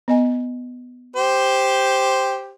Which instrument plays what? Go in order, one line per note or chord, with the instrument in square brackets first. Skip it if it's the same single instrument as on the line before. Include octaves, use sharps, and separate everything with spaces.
[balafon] B3 D#5 G#5
[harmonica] G4 C5